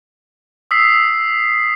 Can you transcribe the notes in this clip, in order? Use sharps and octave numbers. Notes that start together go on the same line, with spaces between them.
D#6 E6 B6 C7